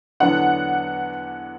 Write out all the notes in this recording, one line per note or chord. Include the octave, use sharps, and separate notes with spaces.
E2 D3 F#3 B3 D4 F#5